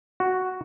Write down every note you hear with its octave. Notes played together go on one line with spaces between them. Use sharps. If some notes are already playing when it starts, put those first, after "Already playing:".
F#4